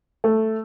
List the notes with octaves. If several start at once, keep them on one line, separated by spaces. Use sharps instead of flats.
A3